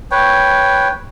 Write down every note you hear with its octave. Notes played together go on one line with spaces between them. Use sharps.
B4 C#5 G5